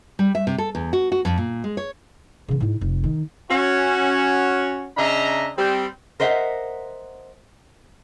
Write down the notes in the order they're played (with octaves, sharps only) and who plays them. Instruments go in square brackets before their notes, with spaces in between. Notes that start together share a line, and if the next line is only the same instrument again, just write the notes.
[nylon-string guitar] G3
E5
C3
A4
E2
F#4
F#4
F2
A#2
G#3
C#5
[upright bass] C#3 E3
G#2 E4
F1
D#3
[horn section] C#4 F#4
C#3 D4 D#5 E5 A#5
G3 C4
[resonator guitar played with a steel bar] A#4 C5 D#5 E5 F#5